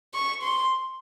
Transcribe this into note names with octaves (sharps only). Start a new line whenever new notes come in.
C#6
C6